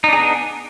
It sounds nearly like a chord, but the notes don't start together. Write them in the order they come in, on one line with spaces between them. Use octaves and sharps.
D#4 D4 G#4 B3